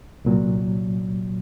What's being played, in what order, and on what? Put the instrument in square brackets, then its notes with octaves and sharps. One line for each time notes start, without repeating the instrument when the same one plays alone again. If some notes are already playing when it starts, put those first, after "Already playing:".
[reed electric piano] C2 A#2 F#3